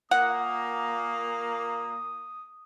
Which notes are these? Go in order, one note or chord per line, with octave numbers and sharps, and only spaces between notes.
A#2 A#3 F#5 D#6